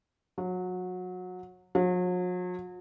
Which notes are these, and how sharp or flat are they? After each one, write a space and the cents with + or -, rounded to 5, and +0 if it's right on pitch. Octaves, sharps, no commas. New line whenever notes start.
F#3 -25
F#3 -45